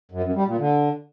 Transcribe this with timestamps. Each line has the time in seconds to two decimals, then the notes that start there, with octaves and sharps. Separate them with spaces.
0.12 F#2
0.23 F#2
0.35 G3
0.47 A#2
0.59 D3